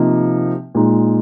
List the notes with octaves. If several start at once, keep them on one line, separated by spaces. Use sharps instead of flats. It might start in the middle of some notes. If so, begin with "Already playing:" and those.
Already playing: C3 F3 A#3 D#4
A#2 G#3 D#4